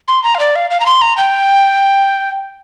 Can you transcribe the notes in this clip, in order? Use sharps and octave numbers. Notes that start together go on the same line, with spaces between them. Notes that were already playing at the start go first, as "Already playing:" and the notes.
C6
A#5
F5
D5
F5
F5
A#5
C6
A#5
G5